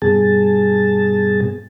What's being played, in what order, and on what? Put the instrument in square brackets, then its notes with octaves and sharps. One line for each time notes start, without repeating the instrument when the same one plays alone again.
[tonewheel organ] G2 B2 G#4 A5